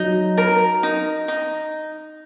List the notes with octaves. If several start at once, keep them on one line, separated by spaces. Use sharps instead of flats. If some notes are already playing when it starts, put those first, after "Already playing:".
Already playing: F#3 D#4
A#4
D#4
D#4